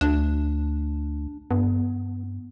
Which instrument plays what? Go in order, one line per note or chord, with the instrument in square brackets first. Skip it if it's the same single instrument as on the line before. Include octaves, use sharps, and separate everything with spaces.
[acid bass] D2 [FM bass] D4
[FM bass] G2 [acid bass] B3